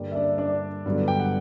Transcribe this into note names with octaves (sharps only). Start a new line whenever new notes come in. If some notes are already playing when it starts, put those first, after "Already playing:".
Already playing: G2 D3 G3 A#3
E5
D4 D5
D4 D5
G2 D3 F#3 B3
G5
F#5